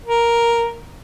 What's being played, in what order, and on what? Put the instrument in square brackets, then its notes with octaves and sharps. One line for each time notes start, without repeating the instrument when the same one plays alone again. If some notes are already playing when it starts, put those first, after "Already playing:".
[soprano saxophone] A#4